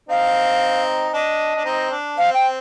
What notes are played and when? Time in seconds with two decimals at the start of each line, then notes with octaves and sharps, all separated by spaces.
0.09 C4 D#4 F5
1.13 D4 D#5
1.55 D4
1.65 C4 D#4
1.91 D4
2.17 C4 F5
2.34 G5